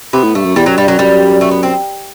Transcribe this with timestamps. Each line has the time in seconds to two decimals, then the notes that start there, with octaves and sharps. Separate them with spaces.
0.13 C3 B3
0.24 A2
0.35 G2 A3
0.45 F#2
0.56 E2 G3
0.66 F#2 F#3
0.78 G2 G3
0.88 F#2 F#3
0.99 F#2 G3
1.41 A3
1.51 B3
1.63 C4